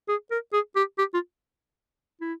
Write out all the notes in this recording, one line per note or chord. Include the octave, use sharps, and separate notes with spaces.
G#4
A#4
G#4
G4
G4
F4
E4